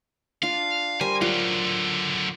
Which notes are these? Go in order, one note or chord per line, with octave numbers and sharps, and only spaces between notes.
D4 F4 F5
G3 A#4 C5 G#5
D3 F#3 F4